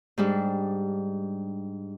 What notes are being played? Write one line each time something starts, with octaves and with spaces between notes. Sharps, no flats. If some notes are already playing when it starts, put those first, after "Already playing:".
G#2 G3 D4